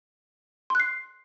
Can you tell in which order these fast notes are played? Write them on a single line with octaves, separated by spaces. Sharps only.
C6 F#6 C7